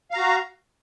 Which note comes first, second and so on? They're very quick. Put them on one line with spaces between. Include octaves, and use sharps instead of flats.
F5 A#5 F#4